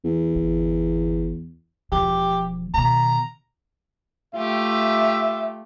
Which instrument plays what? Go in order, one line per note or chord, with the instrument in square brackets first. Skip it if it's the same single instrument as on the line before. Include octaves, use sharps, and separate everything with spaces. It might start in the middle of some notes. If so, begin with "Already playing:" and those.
[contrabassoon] E2
[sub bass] G1
[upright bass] E1 F3 [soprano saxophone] G4
[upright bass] B2 D#3 [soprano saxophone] A#5
[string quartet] A3 F4 G4 [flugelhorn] E5